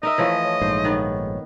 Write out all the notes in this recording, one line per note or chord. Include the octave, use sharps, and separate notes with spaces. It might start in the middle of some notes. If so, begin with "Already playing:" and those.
D#4 A#4 D#5 E5
E3 F3 A3 C#5
C#5
A#1 G#2 C5
D#3 B3